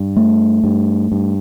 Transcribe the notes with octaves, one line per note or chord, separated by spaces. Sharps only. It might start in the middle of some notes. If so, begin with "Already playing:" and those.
Already playing: G2
A3
G2
G2